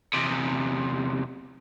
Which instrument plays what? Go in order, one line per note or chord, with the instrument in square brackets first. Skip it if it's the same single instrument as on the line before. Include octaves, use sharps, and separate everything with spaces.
[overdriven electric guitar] E2 C3